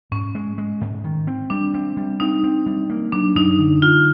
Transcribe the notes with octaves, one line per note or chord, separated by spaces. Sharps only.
G#2 C#4
G#3
G#3
G#2
D#3
C4
G3 D4
C4
G3
C4 D#4
C4
G3
A#3
F#3 D4
F#2 D#4
D3
D3 F4